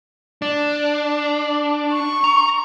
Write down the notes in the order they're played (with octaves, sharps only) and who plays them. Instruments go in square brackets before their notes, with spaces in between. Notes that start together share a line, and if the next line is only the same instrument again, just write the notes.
[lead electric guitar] D4
[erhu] C#6
[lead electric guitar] A#5